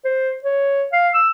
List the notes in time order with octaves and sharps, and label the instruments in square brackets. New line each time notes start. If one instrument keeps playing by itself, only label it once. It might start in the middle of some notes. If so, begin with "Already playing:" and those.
[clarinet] C5
C#5
F5
E6